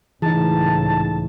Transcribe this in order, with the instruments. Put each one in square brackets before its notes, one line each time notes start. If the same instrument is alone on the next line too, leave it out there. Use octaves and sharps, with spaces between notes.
[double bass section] C#2 A2 [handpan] E3 [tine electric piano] D#4 G#4 [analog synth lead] A5